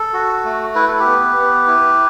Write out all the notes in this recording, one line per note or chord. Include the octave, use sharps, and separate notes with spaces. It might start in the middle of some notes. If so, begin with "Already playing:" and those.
Already playing: A4
F#4
A3
E4 B4
A4
G4 B4
B3
B3
E4